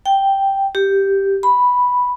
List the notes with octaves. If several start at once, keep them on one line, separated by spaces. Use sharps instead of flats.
G5
G4
B5